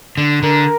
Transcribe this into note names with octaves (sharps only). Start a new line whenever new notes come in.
D3
D3 A#4